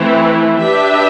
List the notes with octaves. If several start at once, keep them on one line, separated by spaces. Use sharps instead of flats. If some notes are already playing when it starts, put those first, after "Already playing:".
Already playing: E3 A3 C4 E4
D4 G4 B4 E5